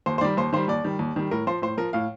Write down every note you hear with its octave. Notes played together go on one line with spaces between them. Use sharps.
D#2 C5
C5
D#3 G3 D5
D#2 C5
D#3 G3 C5
D#2 D5
D#3 G3
D#2
D#3 G3
A2 A#4
F3 C5
A2 C5
F3 A#4
A2 F5